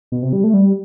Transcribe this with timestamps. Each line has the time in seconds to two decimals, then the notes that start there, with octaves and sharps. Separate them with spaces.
0.12 B2
0.22 C3
0.33 G3
0.44 A3
0.54 G3